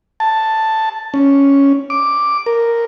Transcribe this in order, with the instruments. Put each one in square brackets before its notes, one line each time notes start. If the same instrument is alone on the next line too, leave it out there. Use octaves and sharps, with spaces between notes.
[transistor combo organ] A5
C#4
D6
A#4